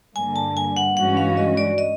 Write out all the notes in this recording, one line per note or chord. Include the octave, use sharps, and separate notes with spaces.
G2 D3 G3 A#3 G#5
A5
G#5
F#5
G2 E3 G#3 C#4 F#4 F#5
F5
D#5
D5
D#5